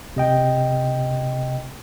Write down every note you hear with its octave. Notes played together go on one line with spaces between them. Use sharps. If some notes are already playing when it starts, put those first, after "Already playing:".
C3 D#5 G5